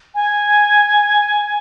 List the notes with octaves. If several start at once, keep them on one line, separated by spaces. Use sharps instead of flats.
G#5